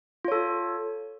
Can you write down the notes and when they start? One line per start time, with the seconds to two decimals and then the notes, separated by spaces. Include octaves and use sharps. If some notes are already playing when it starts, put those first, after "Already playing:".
0.25 F4
0.28 C#5
0.32 A4